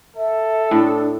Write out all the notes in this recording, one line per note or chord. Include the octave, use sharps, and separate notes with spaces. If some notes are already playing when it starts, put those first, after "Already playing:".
A4 E5
A2 D4